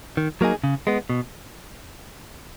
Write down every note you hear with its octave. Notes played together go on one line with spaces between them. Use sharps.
D#3
F#3 A#3 D#4 G#4
C#3
G#3 B3
B2